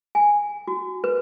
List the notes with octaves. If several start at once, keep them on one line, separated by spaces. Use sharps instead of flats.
G#5
F#4
B4